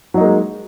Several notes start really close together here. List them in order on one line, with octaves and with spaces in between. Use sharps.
F#3 D#4 A#3 G#3